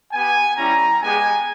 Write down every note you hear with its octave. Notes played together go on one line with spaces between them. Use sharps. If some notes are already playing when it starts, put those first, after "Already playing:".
B3 G4 G#5
G3 C#4 E4 G4 A#5
G#3 B3 G4 G#5